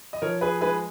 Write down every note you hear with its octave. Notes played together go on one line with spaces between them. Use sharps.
D#5
F3 A#4 C#5
G#4 B4
G#3 G#4 B4